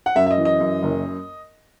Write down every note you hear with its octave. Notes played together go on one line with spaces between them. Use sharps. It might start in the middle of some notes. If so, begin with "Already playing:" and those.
F#5
F#2 E5
E5
D#5
E3
D#5
F#2
F#1